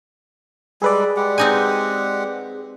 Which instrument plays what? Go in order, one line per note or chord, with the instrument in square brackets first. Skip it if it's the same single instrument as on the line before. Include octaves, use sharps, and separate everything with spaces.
[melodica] G3 G#3 A4 [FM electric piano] G#4 B4 D5
[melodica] G#3 G4 F#5
[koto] C4 D#4 G#5